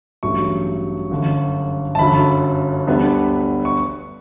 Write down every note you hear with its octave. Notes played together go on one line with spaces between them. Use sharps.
A1 G2 F#3 A3 C#6
G1 F#2 D3
A5
G1 F#2 D3 F#3 B5
D2 D3 G3 B3 D4
C#6